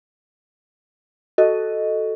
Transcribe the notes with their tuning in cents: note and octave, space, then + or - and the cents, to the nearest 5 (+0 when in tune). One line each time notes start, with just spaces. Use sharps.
F#4 +10 A4 +0 D#5 +0